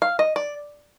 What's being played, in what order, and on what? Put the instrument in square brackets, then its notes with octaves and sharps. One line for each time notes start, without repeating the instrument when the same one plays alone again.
[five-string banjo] F5
D#5
D5